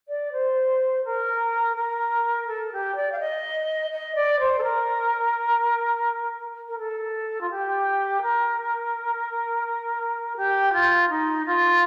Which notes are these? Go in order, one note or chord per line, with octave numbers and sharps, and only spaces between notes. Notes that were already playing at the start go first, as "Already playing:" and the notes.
D5
C5
A#4
A#4
A4
G4
D5
F5
D#5
D#5
D5
C5
A4
A#4
A#4
A4
F4
G4
A#4
G4
F4
D#4
F4